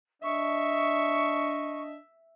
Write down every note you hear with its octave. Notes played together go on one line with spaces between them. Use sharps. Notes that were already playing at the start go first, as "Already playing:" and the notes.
D4 D#5 E5 C#6